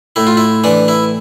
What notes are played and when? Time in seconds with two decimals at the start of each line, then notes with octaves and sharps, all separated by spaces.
0.16 A2 E4
0.27 F4
0.37 E4
0.64 E3 D4
0.88 E4